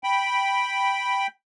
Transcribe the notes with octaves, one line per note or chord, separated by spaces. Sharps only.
G5 B5